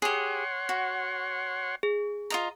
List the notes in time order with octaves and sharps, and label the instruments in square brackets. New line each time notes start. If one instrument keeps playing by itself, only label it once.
[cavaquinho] G4 G#4 [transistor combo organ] C#5 F#5 C6
[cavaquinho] F#4
[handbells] G#4
[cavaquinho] F4 D#5 A#5